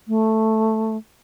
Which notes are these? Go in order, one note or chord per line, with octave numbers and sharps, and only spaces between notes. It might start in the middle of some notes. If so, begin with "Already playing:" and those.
A3